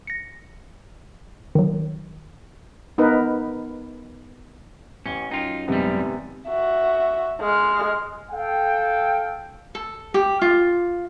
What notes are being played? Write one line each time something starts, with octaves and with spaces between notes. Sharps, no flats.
A#6 C#7
D#3 F#3
B3 D#4 A#4 B4
A1 C#4 G7
F#2 D#4 F4 G5
G#1 F#2 C3 G3 G#3 B3
F#4 E5
G#3 F6
A4 F5 G5
A4
G4
F4